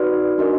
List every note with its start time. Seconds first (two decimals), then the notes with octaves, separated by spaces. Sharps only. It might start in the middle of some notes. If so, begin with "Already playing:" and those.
Already playing: D#4 F#4 B4 D5
0.38 D4 F#4 A#4 D#5